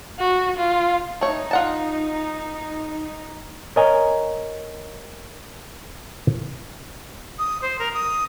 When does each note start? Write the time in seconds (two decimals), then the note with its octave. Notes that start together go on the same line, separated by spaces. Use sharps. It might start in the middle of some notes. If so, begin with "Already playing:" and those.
0.19 F#4
0.57 F4
1.21 A3 D#4 C#5
1.51 F4 F#5 A5
3.76 A#4 C#5 D#5 G#5 A#5
7.39 D#6
7.62 C5
7.79 A#4
7.94 D#6